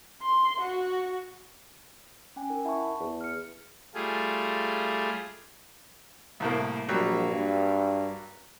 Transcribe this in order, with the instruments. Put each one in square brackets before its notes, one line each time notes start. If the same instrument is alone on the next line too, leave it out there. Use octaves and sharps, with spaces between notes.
[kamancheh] C6
F#4
[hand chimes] C#4 G5 G#5
D#4 A#4
[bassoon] E4 [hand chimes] F#5 A5 C#6
[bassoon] E2
[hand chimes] F6 C#7
[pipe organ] G3 A3 F4 G#4
[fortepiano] C2 A2 A#3
[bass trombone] A#1 [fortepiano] F#3 G3 A#3
[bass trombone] G2